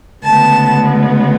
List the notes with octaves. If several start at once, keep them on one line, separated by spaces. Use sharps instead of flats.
D2 C#3 G#3 B3 A5